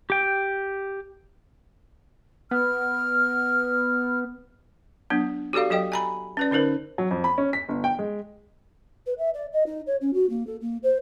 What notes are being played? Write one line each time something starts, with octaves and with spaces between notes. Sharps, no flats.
G4 G5
B3 F6
F#3 B3 D4
F#4 G4 A4 D5 F5
F#3 A4 D#5 G5
G#5 A#5 B5
C#4 B4 D5
D3 C#4 D#4 A#4 C5
F#3
F2
B5
C#4
B6
G1
G5
G#3
B4
E5
D5
D#5
D#4
C#5
C#4
F#4
A#3
A4
A#3
C5